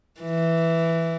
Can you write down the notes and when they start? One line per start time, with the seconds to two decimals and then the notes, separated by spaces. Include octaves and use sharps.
0.21 E3